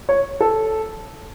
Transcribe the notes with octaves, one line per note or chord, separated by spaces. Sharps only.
C#5
A4